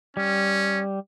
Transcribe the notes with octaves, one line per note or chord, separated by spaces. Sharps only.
G3 C#4